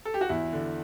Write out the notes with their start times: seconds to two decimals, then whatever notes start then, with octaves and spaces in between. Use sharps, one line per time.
0.05 A4
0.14 G4
0.21 F#4
0.29 E2 E4
0.53 D3